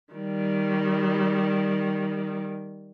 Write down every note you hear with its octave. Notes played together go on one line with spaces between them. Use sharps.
D#3 G3